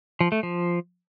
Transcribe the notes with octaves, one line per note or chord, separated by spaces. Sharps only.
F3
A3
F3